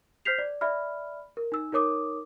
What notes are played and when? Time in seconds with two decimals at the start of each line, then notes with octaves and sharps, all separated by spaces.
0.25 C5 F6 G6 B6 C7 F7
0.38 D5
0.61 D5 E5 B5 F6
1.37 A#4
1.52 D#4 E6
1.72 D#4 A#4 C#5 D6 D#6